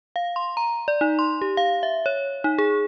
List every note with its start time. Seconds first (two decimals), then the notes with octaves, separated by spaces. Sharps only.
0.16 F5
0.36 C6
0.57 A#5
0.88 D5
1.01 D#4
1.19 C6
1.42 G4
1.57 F5
1.83 E5
2.06 C#5
2.44 D#4
2.58 G#4